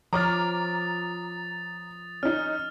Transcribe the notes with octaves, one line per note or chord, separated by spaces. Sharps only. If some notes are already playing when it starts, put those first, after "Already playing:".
F3 C#5 A#5 D6 D#6 F6 A6
C#4 D#4 F6